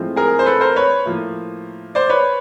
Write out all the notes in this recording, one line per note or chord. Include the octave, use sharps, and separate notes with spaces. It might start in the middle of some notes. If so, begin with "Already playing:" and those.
Already playing: A2 F3 G#3 C4
G#4 A#4
C5
A4 B4
A#4 C5
B4 C#5
A2 F3 A#3
C5 D5
B4 C#5